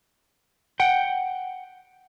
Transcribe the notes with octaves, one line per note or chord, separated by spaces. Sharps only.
F#5 G5